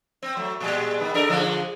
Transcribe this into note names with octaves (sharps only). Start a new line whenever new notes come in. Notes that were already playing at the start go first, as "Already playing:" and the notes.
C4
F#3 A3
A#2 G3 G#3
D#3 B3
D4 A4 A#4
D3 F3 G#3